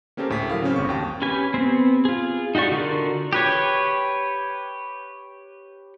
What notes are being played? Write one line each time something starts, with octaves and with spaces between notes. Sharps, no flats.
A#3 C#4 G4 A4 A#4 C5
D2 A2 G#4 B6
F#3 A#4 F5
C#3 C4 C#4
G1 C#6
D#2 G5
C#4 G4 B4 G#5
B3 C4
F4 G#4
D#4 F#4 G4 D5 C#6
D3 F4 F#4 A#4 D5
G4 B4 C#5